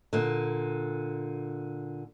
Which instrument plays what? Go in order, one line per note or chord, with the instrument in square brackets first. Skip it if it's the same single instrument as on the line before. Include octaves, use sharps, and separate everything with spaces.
[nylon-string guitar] A#2 D3